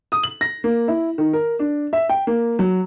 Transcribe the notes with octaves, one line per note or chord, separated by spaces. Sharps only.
D#6
F#7
A#6
A#3
E4
D#3
A#4
D4
E5
G5
A#3
F#3